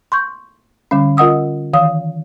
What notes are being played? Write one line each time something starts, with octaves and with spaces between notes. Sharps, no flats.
C6 C#6 G6
D3 G3 C#4
F4 A#4 D#5 F#5 D#6 E6
D#3 E3 F5 D#6